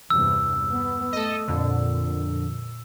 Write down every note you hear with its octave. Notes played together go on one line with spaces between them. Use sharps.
E2 G2 C3 E6
B3
A3 A4 D#5
F2 A#2 D3